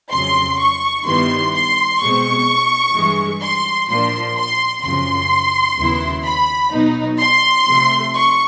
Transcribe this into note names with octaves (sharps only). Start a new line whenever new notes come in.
F2 C#3 F#3 C6
C#6
G2 D#3 G3 B3 E4 C6
C6
B2 G#3 C4 C#6
G2 E3 G#3
C6
A#2 F3 A#3 D4 C6
C6
F#2 C#3 F3 C6
D#2 C#3 F#3 B3 E4
B5
B2 F#3 B3 D#4
C6
C3 F3 A3
C#6